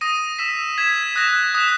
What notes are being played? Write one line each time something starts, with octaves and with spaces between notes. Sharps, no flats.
D#6 A#6 D#7
E6 B6 E7
G#6 B6 E7
D#6 F#6 A#6 E7
D#6 F#6 B6 E7